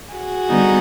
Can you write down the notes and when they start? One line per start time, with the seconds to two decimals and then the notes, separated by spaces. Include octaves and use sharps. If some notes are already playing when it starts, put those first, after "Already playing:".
0.14 F#4 G#4
0.49 D3 G3 B3 D#4